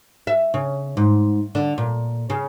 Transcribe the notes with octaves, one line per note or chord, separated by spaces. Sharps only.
E5
C#3
G#2
D3
A#2
C#3